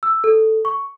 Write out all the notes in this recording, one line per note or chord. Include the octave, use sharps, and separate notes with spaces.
E6
A4
C#6